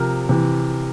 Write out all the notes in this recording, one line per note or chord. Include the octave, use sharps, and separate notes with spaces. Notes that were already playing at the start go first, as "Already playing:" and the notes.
Already playing: C3 F3 A#4
C3 E3